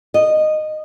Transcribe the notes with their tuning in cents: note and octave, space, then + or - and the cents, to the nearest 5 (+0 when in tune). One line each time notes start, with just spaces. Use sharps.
D#5 -15